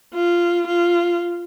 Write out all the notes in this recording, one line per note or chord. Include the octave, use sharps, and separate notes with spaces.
F4
F4